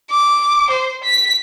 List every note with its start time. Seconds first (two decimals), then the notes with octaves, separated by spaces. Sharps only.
0.11 D6
0.71 C5
1.04 B6